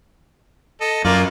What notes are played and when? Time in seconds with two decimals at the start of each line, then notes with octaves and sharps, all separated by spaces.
0.81 A4 D#5
1.04 F#2 A#3 F4 D5